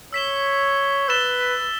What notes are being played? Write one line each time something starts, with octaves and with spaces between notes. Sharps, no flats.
C#5 E6 B6 E7 G7
B4 E6 A6 E7 G7